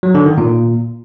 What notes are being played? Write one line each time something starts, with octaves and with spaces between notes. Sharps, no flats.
F#3
D3
D#3
A#2